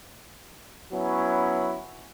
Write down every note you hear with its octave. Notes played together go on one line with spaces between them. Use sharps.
F#3 B3 C#4 E4